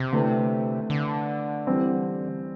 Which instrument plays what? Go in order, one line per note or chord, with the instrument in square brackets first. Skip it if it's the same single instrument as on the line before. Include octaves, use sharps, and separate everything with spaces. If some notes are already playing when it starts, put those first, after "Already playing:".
Already playing: [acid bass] C3
[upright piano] D3 A3 E4 B4
[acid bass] D3
[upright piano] E3 G3 C4